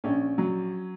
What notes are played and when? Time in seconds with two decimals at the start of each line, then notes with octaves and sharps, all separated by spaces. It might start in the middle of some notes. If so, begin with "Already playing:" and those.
0.04 A#1 C#4
0.38 F#3